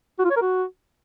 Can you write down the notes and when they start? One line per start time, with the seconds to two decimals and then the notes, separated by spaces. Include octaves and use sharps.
0.19 F#4
0.25 F4
0.30 C#5
0.36 A#4
0.42 F#4